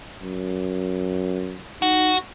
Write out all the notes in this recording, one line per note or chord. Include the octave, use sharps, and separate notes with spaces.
F#2
D#4 F#4